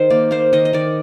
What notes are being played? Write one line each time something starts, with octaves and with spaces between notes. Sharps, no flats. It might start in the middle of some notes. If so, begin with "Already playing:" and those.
Already playing: D#3 C5
A#3 D5
A#3 C5
D#3 D#5
D#5
D#3 D5